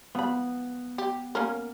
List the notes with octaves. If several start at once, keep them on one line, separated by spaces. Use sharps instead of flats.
F3 B3 B5
G4
A#3 C#4 A#4